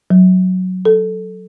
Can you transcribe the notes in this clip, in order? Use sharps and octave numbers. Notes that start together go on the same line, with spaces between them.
F#3
A4